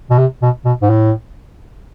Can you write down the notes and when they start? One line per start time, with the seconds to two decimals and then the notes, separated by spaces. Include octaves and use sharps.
0.10 B2
0.18 C3
0.42 B2
0.65 B2
0.82 G#2
0.90 A2